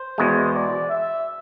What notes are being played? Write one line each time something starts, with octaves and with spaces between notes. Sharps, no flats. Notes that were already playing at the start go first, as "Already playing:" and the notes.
Already playing: C5
E2 B2 G#3
D5
E5